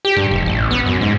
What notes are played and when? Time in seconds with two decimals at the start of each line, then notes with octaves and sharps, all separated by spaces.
0.05 G4
0.17 G2
0.31 F1
0.46 A1
0.71 B3
0.86 F#2
1.01 G#2